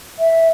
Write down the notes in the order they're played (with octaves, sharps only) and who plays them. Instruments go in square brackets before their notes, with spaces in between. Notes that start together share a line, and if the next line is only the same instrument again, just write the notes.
[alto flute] E5